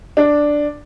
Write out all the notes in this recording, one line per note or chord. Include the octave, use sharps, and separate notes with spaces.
D4